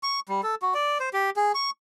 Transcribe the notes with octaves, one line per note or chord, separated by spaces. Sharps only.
C#6
G3
A4
F#4
D5
C5
G4
G#4
C#6